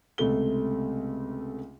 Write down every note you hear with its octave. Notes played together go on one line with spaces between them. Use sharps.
C#2 C3 A3 G7